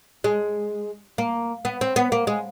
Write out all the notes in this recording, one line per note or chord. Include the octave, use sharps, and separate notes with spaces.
G#3
A#3
B3
C4
B3
A#3
G#3